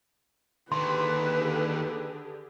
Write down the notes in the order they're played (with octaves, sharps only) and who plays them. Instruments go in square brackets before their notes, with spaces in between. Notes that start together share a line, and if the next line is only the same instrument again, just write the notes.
[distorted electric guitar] D#2 D#3 [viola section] D3 G4 G#4 [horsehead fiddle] B4 [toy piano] C6